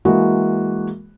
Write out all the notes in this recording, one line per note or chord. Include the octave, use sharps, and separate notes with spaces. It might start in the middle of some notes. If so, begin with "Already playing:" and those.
E3 G#3 A#3 F#4 G#4